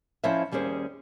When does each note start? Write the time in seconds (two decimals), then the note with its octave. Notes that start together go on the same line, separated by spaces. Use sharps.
0.24 F3 C#4 E4 C5 D#5 E5
0.52 D#2 G3 C#4 G#4 C5